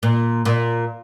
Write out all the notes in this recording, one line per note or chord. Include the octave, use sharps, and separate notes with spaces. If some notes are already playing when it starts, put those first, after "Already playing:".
A#2
A#2